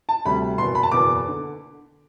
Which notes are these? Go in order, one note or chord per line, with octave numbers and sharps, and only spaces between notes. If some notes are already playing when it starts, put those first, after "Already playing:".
A5
D2 C3 G3 B5
F#1 E2 B2 C6
B5
A5
F#1 E2 B2 D6
D3